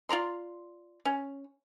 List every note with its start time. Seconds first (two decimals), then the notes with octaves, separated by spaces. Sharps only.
0.09 F4 D5 A#5 C6
1.05 C#4